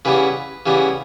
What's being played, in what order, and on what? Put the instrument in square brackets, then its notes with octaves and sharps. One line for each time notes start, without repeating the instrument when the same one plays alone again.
[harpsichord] C#3 E3 G3 B3 B4
C#3 E3 G3 B3